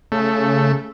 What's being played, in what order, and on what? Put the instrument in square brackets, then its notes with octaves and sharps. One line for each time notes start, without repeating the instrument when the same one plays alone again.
[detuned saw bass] C#3 [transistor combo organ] A3